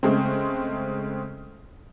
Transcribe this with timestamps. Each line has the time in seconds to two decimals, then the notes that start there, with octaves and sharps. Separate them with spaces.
0.03 C#3 G#3 A3 C4